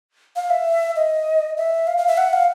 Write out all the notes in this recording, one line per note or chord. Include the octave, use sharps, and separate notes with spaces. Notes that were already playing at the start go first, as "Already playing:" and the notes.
F5
E5
D#5
E5
F5
F5
E5
F#5
F5